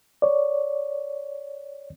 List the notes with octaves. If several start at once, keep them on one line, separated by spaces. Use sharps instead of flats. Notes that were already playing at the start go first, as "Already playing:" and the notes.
C#5 D5